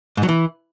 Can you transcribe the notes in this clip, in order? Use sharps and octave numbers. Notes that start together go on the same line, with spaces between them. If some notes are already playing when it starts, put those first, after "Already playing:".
G#2
F#3
E3